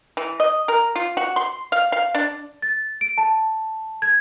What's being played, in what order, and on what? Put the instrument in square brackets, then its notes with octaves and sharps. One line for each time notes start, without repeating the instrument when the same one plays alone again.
[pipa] E3
D#5
A#4
F4
F#4
C6
F5
F5
D4
[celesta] A6
D7
A5
G#6